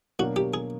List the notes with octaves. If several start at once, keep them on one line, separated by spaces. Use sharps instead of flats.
B2 F#3 A#3 D4 F#4
G4
G#4